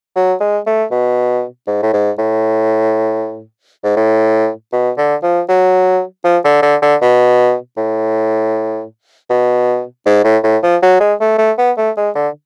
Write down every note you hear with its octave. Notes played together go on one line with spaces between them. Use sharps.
F#3
G#3
A3
B2
G#2
A2
G#2
A2
G#2
A2
B2
D3
F3
F#3
F3
D3
D3
D3
B2
A2
B2
G#2
A2
A2
F3
F#3
G#3
A3
A3
B3
A3
G#3
D3